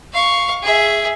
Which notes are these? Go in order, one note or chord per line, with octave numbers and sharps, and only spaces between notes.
F5 C#6
G#4 E5